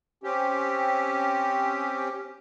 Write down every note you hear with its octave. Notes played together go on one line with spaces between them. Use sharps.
C4 C#4 G4